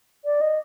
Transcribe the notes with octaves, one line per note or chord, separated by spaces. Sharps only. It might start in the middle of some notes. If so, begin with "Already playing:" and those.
D5
D#5